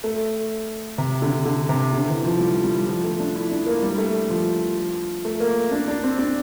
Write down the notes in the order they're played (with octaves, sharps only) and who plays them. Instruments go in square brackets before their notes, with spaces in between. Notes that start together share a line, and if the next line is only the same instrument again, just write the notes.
[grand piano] A3
C3
D3
D3
C3
D3
E3
F3
G3
G3
F3
A3
D4
E4
D4
A#3
G3
A3
F3
A3
A#3
D4
D4
C4
D4